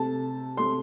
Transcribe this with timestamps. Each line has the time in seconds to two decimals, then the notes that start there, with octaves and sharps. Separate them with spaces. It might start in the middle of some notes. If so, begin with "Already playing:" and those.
Already playing: C3 A3 A5
0.57 C3 A3 C6